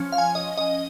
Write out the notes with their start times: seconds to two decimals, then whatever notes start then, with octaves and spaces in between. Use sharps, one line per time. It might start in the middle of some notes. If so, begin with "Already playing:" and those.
Already playing: F3 C#4
0.12 F5
0.18 G#5
0.35 D#5
0.58 D#5